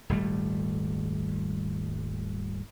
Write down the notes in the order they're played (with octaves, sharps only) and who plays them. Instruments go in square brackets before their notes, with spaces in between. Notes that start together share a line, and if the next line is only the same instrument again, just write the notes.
[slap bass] D#1 G#1 G3 A3